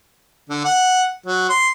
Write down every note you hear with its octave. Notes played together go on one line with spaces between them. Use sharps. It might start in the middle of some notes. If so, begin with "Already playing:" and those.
D3
F#5
F#3
C6